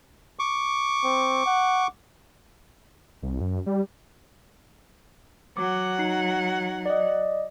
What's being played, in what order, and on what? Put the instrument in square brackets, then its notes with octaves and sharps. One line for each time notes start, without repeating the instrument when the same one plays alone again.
[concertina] C#6 D6
[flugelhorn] C4
F#5
[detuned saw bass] C2
F#2
G3
[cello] F#3 F#5 [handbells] D6
[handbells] D#4 C7
D5 D#5